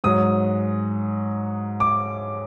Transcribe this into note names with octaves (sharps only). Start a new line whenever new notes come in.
G#2 F#3 D#6
D6